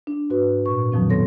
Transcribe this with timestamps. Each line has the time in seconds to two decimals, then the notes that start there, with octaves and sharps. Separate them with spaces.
0.07 D4
0.30 G#2 F#4 B4
0.66 A#2 C#6
0.92 F2 B2 D#3 F3 F#3 C4
1.09 B3 A4 C#5 C6 A#6